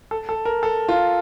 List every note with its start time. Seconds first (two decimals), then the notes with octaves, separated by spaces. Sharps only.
0.11 A4
0.29 A4
0.45 A#4
0.63 A4
0.89 F4